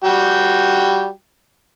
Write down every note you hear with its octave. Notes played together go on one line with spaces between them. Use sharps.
G3 F#4 G5